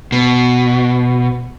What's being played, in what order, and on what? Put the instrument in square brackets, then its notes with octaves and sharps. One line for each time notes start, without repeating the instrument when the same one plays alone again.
[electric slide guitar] B2